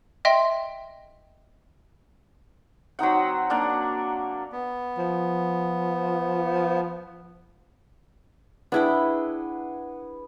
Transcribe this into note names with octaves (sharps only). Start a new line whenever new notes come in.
D#5 E5 G5 C6
F#3 C4 D#4 F#5
A#3 D4 D5 F#5
B3
F3
B3 D4 E4 G#4 G5